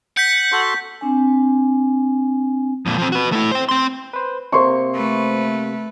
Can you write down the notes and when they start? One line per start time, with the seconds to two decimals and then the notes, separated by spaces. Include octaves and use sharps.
0.17 F#5 G6 B6
0.52 F#4 A4 C6
1.01 C4 D4 G#5
2.86 F2 A#2
2.98 F3 C4
3.12 F#4 B4
3.32 A3 E4
3.52 C5 G5
3.69 C4 C6
4.13 B4 C5
4.52 C3 A#3 C5 C6 C#6
4.94 A3 B4